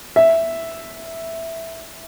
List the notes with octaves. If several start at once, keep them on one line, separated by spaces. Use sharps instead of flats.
E5